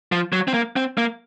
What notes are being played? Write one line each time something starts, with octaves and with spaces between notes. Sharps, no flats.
F3
F#3
C4
A#3
C4
A#3